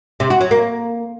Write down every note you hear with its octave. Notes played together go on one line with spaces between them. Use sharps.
C3
F#4
F#3
A#3